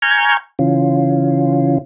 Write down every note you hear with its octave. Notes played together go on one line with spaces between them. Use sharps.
G#5 A#5 C#6 F6 G6 G#6
C#3 E3 C#4 F4